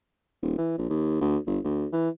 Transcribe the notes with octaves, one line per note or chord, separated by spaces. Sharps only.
D#1
E3
A#1
D#2
D2
G1
D2
E3